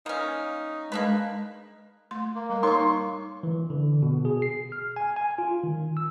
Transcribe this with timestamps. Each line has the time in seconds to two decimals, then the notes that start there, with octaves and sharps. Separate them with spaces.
0.06 A#3 C#4 D#4
0.92 G#3 A#3 D4 B4
2.11 A3 C6
2.35 A#3
2.49 G3 A#3 A#4
2.63 D#4 C#5 C6 C#6
3.43 E3
3.70 D3
4.02 B2
4.25 G#4
4.42 C7
4.72 F6
4.96 G#5
5.16 G#5
5.38 F4
5.64 D#3
5.97 E6